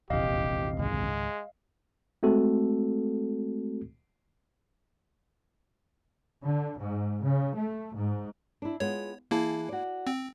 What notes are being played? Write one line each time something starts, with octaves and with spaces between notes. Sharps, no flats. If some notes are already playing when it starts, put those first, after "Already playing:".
D#1 A#1 E2 C3 G4 D#5 F5
C#2 G#2 D#3 G#3
G#3 A3 C4 F#4 A4
D3
G#2
C#3
A3
G#2
D4 E4
G#3 B3 F4 C#5
E3 A#3 E4 G#4 A5
F#4 D5
C4